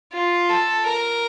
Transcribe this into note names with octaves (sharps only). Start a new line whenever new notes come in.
F4
A4
A#4